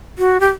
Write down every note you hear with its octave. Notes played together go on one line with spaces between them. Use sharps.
F#4
G4